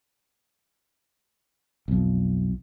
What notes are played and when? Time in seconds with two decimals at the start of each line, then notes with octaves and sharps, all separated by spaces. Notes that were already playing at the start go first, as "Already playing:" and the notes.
1.88 B1 F2